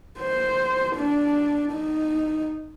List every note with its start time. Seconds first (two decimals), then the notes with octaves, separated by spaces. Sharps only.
0.19 C5
0.96 D4
1.73 D#4